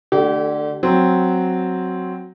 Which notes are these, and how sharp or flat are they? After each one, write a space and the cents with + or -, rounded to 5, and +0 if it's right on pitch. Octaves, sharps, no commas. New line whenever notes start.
D3 +20 A3 +0 G4 -35
F#3 +0 C4 +0